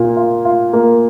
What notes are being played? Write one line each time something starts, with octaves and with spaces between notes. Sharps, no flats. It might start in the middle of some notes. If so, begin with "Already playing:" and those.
Already playing: A#2 A#3
F4
F4
A#3